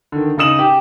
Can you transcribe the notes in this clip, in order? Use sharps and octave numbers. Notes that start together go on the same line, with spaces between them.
D3 D#3
C#3 D#4 D#6 E7 F#7
G4